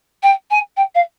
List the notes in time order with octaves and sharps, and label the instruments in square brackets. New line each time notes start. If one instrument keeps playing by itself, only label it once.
[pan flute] G5
G#5
G5
F5